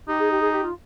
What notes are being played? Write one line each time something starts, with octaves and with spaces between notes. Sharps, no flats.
D#4 G4
G#4
G4
G#4
G4
F4